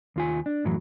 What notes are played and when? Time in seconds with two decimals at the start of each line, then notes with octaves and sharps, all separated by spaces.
0.16 D#2 F4 G#5
0.46 D4
0.65 F#2 A2 E3 F#3